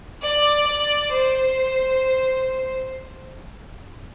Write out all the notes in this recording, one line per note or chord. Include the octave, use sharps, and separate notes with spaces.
D5
D5
C5